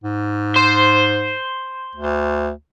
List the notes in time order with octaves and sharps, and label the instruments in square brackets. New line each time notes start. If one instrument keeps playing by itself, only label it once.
[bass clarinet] G#2
[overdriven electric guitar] C5
[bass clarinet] D2